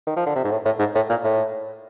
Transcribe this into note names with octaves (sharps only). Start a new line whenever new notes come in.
D#3
F3
D3
C3
G#2
A2
A2
G#2
A2
A#2
A2